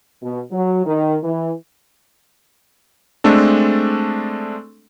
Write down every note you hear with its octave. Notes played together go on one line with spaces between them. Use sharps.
B2
F#3
D#3
E3
G#3 A3 C4 D4 A4